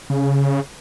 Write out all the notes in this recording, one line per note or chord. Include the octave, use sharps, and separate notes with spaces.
C#3